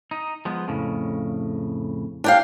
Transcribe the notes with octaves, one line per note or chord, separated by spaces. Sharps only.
D#4
F3 G#3 B3
F2 A2 C#3
D4 G4 F5